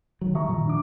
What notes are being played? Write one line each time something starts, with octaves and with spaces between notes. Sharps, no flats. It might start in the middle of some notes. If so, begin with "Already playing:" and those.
D#3 F#3
E3 G3 E5 A#5 C#6
A#2 D#3 F3
D4 D6